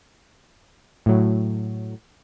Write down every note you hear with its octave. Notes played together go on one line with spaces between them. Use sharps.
A2 F#3